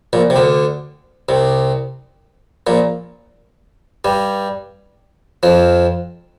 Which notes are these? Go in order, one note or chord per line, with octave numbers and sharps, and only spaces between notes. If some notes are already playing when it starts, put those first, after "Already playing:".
A#1 A#2
C3
D2 D3
C2 C3
A#1 A#2
G2 G3
F2 F3